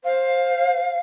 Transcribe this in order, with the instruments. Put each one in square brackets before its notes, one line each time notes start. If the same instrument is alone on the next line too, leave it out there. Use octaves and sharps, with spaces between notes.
[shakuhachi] C5 [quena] F5